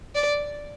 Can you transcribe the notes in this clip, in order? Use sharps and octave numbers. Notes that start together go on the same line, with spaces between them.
D5